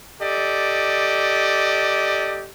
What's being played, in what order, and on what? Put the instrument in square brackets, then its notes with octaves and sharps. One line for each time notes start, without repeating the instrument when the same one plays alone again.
[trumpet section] G4 A4 D5 D#5